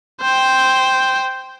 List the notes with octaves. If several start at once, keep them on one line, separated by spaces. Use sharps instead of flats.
C5 G5